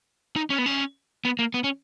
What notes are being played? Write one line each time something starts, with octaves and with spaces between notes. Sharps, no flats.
D#4
C#4
B3
C#4
B3
A#3
B3
C#4